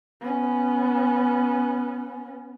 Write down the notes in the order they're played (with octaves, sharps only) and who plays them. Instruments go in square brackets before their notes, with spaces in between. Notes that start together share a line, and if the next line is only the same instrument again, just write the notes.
[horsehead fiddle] B3 C#4